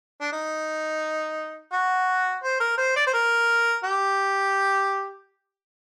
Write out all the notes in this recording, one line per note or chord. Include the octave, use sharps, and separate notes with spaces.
D4
D#4
F#4
C5
A#4
C5
D5
C5
A#4
G4